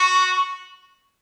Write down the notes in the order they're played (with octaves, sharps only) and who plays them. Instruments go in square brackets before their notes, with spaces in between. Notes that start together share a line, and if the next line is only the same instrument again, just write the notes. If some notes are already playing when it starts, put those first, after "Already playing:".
Already playing: [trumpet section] F#4 [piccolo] C#6